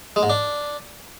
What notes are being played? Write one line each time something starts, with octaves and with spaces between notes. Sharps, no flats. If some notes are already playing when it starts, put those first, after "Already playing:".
G#3
G#2
D4